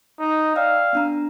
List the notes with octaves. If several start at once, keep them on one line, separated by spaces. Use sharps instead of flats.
D#4
D5 F5 G5 E6
B3 D4 A#5